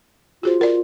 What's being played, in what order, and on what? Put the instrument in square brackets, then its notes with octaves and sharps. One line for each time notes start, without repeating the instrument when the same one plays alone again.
[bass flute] F4 [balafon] F#4 G#4 C5
[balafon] A#4 D5